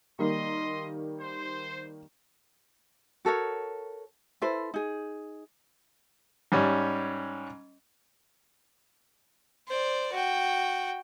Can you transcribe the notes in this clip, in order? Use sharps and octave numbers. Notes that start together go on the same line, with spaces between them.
D#3 G3 A#3 D#5 C6
C5
F#4 A4 A#4 C#5
E4 A4 B4 C5
D#4 G#4
G#2 G3 C#4
C5 D5
F#4 G5